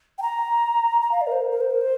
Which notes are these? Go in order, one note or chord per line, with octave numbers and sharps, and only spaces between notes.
G5
A#5
A#5
F5
D5
A#4
C5
A#4
A#4
C5
A#4
C5